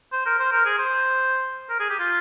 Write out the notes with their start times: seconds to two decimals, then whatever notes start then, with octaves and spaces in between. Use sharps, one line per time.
0.12 C5
0.26 A#4
0.39 C5
0.52 A#4
0.65 G#4
0.78 C5
1.70 A#4
1.80 G#4
1.90 G4
1.99 F4